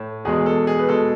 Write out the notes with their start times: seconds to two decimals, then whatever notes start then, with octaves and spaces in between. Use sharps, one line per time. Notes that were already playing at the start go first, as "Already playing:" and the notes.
Already playing: A2
0.25 E2 B2 G#3 G#4
0.46 A4
0.67 G#4
0.79 B4
0.89 B2 G#3 A4